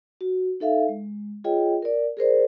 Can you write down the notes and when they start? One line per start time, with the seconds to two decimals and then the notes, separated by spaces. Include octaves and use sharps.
0.21 F#4
0.60 D#4 A4 E5 F5
0.89 G#3
1.44 F4 G#4 C#5 D#5 G5
1.82 A#4 D5
2.17 G#4 A#4 C5 D5